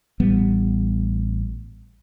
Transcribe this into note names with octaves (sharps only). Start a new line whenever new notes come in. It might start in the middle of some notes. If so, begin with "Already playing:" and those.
A1 G3 B3